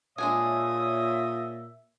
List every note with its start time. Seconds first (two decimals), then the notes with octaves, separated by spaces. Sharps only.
0.18 A#2 G#3 D4 G#4 C#5 E5 D#6